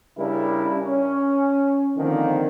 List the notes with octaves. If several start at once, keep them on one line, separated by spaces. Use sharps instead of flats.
C#3 G3 D4 E4 A#4
C#4
D3 D#3 F3 A#3 C4 A#4